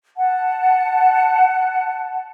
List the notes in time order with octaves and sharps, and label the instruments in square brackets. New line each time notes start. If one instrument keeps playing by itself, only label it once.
[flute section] F#5 A5